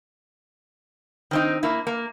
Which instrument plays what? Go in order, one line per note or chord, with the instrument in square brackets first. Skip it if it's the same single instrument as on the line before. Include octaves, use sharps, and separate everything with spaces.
[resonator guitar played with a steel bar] D#3 C4 D#4
A#3 E4
A#3